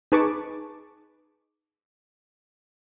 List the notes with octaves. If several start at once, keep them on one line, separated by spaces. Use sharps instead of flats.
D#4 G#4 B4 A5 C#6 D6